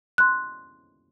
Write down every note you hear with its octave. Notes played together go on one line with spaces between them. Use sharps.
C6 F#6